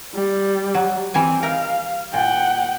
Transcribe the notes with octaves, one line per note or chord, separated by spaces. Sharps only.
G3
F#3
E3 G3 C4 G#5
D#4 A#4 F5
A#2 F#5 G5